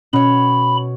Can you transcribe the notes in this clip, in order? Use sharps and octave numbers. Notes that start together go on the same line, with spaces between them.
B2 C#4 C#5 B5